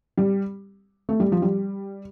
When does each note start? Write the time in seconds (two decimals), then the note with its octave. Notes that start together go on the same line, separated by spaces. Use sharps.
0.18 G3
1.09 A3
1.20 G3
1.32 F3
1.42 G3